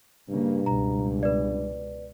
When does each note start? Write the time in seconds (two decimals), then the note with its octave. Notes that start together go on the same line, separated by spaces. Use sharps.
0.29 G2 C#3 A#3
0.66 C#2 B2 A#5
1.23 B4 D5